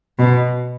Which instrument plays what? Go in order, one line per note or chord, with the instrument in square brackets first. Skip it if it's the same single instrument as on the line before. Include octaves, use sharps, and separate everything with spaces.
[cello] B2